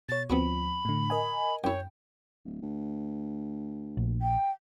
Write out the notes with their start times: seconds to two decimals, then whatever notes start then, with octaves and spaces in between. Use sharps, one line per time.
0.09 B2 C#5 A6
0.30 D2 F3 B3 C4 F#4 B5
0.85 A2 D3
1.10 A#4 D#5 G#5
1.64 F#2 E4 C#5 G5
2.45 D1
2.62 D2
3.97 A#1
4.22 G5